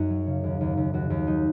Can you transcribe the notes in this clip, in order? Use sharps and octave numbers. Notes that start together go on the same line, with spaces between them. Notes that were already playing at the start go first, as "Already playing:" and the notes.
Already playing: F#2 D#4 F#4
F#3
C#3
D#2
D#2
D#2
D#2 F#4
D#2
F#3 D#4